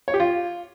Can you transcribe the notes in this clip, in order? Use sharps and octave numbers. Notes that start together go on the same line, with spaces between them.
C#5
G4
F4